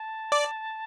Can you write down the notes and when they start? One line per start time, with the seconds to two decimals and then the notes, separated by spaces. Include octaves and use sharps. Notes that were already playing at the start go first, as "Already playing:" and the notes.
Already playing: A5
0.32 D5